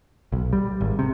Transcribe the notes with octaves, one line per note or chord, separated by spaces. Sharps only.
B1
G3
G#1
C3